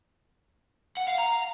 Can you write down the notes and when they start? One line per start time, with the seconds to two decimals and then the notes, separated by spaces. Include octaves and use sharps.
0.97 F#5
1.08 F5
1.18 A#5